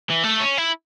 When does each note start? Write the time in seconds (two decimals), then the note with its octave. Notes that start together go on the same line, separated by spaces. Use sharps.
0.11 E3
0.24 A3
0.41 C#4
0.58 E4